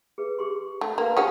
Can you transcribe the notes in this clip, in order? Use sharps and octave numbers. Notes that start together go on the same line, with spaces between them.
G#4 B4
G4 G#4 C6
A3 F#5
A#3 B4 F5
C#3 C#4 F#4 G4